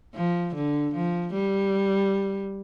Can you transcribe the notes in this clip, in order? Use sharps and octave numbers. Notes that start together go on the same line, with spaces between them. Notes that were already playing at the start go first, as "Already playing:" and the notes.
F3
D3
F3
G3